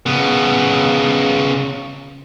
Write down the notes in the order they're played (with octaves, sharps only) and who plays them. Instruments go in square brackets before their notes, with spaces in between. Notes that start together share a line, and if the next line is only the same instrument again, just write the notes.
[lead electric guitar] C#3 B3